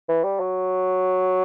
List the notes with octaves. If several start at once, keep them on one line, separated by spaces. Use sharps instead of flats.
E3
G3
F#3